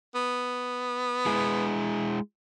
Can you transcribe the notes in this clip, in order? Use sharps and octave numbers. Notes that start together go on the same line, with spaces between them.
B3
G#3 E4 G#4